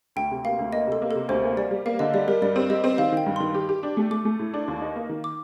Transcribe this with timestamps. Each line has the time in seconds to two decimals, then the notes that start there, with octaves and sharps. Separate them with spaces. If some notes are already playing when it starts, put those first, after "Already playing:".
0.16 D2 G5
0.31 C3
0.45 A#3 F5
0.59 D2
0.73 A#3 D#5
0.87 C3
0.92 A4
1.02 A#3
1.11 A4
1.15 C3
1.29 D2 C5
1.44 A#3
1.57 G3 D5
1.71 G3
1.86 A#3 F5
1.99 D3 D#5
2.14 G3 D5
2.28 G3 A#4
2.42 G2 D5
2.56 C4
2.70 G3 D#5
2.84 C4
2.98 D#3 F5
3.12 D#3 G5
3.26 G2
3.36 D#3 C6
3.54 G4
3.69 G4
3.83 D4
3.97 A3
4.11 A3 D6
4.25 A3
4.39 A2
4.54 D4
4.68 D#2
4.82 D#4
4.96 A#3
5.09 D#3
5.24 D6